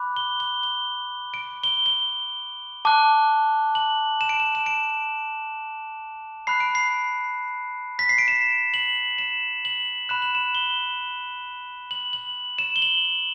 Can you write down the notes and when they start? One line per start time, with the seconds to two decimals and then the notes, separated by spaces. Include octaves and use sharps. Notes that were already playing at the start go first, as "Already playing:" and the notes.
Already playing: B5 D6 F#6
0.16 G7
0.40 G7
0.63 G7
1.34 D7
1.64 G7
1.86 G7
2.85 A5 D6 F#6
3.75 F#7
4.21 E7
4.29 D7
4.40 E7
4.55 E7
4.66 D7
6.47 B5 F#6 C7
6.60 D7
6.75 C7
7.99 B6
8.09 C7
8.18 D7
8.28 E7
8.74 F#7
9.18 E7
9.65 F#7
10.09 B5 F#6 E7
10.22 F#7
10.35 E7
10.55 G7
11.91 F#7
12.13 F#7
12.59 E7
12.76 G7
12.82 F#7